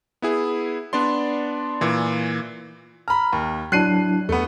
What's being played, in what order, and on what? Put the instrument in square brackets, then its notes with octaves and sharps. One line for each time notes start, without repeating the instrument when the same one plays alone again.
[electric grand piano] B3 E4 G#4
B3 D4 D5 C6
A#2 E3
[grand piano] A#5 B5 [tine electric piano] F6
[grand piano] D#2
[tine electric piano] F#3 D4 E4 [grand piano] F#6 C7 D#7
[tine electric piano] E2 [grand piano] A3 B3